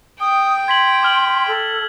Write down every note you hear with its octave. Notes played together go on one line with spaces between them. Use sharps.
G5 D#6
C6 G#6 B6 F#7
D6 F6 F#7
A4